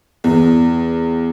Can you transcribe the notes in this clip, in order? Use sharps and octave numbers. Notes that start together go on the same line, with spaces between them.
E2